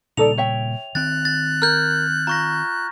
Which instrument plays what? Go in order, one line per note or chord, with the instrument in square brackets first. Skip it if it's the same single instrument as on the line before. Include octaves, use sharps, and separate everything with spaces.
[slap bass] A#2 C#3 G3 [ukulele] D#4 A4 D5 [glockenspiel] F7
[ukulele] C#5 E5 G5
[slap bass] D#3 C4 [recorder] F#6 [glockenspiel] A6
[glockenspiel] A6
[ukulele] A#4 [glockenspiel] F6 G6
[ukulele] F4 [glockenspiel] A#5 C#6 A#6